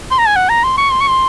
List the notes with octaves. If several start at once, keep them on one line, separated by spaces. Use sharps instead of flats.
C6
A#5
G#5
F#5
A#5
C6
C#6
C6
C#6
C6